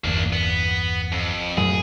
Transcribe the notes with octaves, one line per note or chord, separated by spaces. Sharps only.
G1 E2 A#3 D4
B3
F2
F#2 A2 F#3 G#4